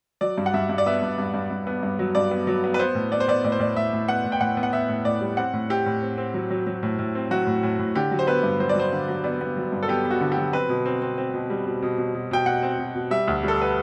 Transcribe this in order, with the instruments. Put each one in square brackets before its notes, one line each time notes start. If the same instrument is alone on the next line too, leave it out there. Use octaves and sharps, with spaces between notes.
[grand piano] F#3 D5
G2
F#5
G2 E5
G2
D5
B3 E5
G2
G2
G2
G2
B3
G2
F#3
G2 D5
B3
F#3
B3
B4
B3 C5
A2
B3 D5
C5
B3 D5
A2 D5
C5
A2 D5
A2 E5
A2
B3 F#5
A2
G5
A2 F#5
B3
F#5
B3 E5
A2
A2 D5
G3
C4 F#5
A2
C4 G4
A2
C4
C4
F#3
F#3
F#3
A2
A2
C4
F#3 F#4
A2
A2
A2
D3 G4
F#3
C5
B3 B4
G2
F#3 C5
D5
F#3 C5
D3
F#3
B3 D5
B3
F#3
G2
A4
B3 G4
B3
F#4
D3
G4
F#3
C4 B4
B2
C4
C4
C4
B2
G3
B2
B2
B2
B2
B2 G5
B2 F#5
C4
B2
B2
G3 E5
D2
G3 A4
B4